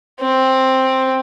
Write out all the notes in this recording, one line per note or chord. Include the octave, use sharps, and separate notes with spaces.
C4